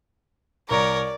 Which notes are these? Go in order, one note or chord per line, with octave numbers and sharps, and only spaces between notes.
C2 A#4 C#5 D5 A#5